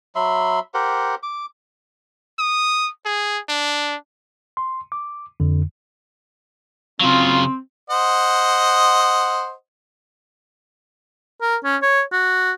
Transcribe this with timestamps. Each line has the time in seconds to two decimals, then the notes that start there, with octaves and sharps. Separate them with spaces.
0.16 F#3 E5 B5 C6
0.74 G4 A#4 C5 F#5
1.23 D6
2.39 D#6
3.06 G#4
3.49 D4
4.57 C6
4.92 D6
5.40 F2 D3
7.01 C#3 F#3 C4 F4
7.90 C5 D#5 F#5
11.42 A#4
11.64 C#4
11.82 C#5
12.12 F#4